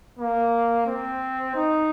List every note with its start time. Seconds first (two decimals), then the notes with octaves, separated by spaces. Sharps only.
0.19 A#3
0.87 C4
1.56 D#4